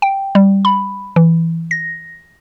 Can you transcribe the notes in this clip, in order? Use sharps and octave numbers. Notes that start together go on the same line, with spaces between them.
G5
G3
B5
E3
A#6